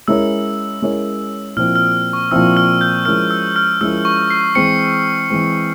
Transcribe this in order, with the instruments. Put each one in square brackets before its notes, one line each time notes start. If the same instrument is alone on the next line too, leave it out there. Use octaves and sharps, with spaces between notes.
[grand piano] G#3 C#4 E4 A#4 C#5 [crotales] E6
[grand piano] G#3 C#4 E4 A#4 C#5
[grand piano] A#2 F3 C4 E4 [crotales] F6
[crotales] F6
C#6
[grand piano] A#2 F3 C4 E4 [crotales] E6
[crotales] F6
G6
[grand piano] F3 G#3 C#4 E4 A#4 [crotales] F6
[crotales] E6
F6
[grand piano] F3 G#3 C#4 E4 A#4 [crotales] E6
[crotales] C#6
C7
[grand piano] E3 G#3 C4 [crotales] C#7
[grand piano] E3 G#3 C4